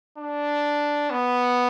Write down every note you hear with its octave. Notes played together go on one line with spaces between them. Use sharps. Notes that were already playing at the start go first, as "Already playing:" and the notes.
D4
B3